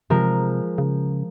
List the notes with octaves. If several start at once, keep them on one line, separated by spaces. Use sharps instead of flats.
C3 F3 G#3 A#4
C#3